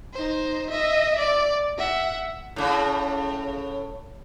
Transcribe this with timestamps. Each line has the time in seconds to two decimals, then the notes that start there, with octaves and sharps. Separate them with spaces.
0.14 D#4 C5
0.70 D#5 E5
1.18 D5
1.78 E5 F#5
2.56 A2 C#3